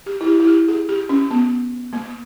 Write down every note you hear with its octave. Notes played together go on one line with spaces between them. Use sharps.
G4
E4
G4
E4
G4
G#4
G4
C#4
B3
A#3